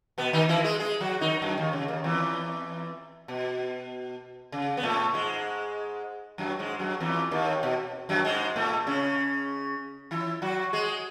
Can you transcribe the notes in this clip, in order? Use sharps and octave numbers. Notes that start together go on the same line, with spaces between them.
B2 B3
D#3 D#4
E3 E4
G#3 G#4
G#3 G#4
F#3 F#4
D#3 D#4
F#2 F#3
D#2 D#3
C#3
D#2 D#3
E2 E3
B2
C#3
B3
A2 A3
G#2 G#3
F#2 F#3
G#2 G#3
F#2 F#3
E2 E3
D#2 D#3
B2
F#2 F#3
G#2 G#3
A2 A3
C#3 C#4
E3 E4
F#3 F#4
G#3 G#4